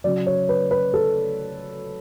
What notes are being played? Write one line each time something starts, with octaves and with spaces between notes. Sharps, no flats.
C#3 F#3 D5
C#5
B4
B4
A4